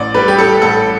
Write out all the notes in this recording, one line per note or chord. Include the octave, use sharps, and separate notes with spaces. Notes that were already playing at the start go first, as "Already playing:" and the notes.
Already playing: A1 D5
G3 B4
G4
G3 A4
A1 A4